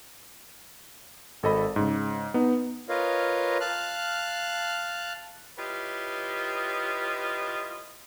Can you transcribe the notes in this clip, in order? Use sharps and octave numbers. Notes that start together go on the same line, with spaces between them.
G#1 A4 D#5 B5
G#2 C#3
B3 D#4
F4 A#4 B4 C#5 D#5 F5
F5 A5 F6 F#6
E4 F4 G4 B4 C#5 D#5